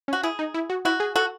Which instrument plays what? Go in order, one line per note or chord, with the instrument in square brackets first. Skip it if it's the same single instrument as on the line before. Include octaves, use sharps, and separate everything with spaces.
[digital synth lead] C#4
[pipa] F#4
[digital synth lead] E4 [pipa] G#4
[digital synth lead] D#4
E4
F#4
[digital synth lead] E4 [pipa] F#4
[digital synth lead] G#4
[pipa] F#4 [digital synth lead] A4